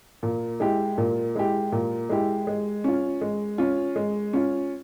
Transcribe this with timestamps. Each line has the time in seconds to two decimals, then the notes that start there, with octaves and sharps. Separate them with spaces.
0.23 A#2
0.60 G#3 E4 G4
0.98 A#2
1.35 G#3 E4 G4
1.72 A#2
2.09 G#3 E4 G4
2.47 G#3
2.84 C#4 F4
3.21 G#3
3.58 C#4 F4
3.96 G#3
4.33 C#4 F4